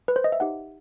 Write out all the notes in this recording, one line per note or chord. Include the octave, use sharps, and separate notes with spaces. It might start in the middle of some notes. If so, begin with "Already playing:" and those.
B4
C5
D#5
E5
D#4 G4 F#5